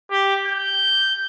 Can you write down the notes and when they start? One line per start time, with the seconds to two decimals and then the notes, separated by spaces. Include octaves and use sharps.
0.11 G4
0.47 G6